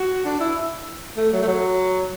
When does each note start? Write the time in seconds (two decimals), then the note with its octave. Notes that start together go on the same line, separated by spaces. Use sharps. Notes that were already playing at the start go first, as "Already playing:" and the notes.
Already playing: F#4
0.25 D4
0.40 E4
1.17 A3
1.32 F#3
1.42 A3
1.48 F#3